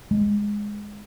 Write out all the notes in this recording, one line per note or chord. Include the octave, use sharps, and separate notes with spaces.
G#3